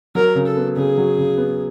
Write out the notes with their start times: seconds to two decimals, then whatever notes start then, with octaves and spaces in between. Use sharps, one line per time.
0.15 F#3 A#4
0.35 C#3
0.46 A4
0.57 B3
0.76 C#3 G#4
0.97 F#3
1.18 C#3
1.37 B3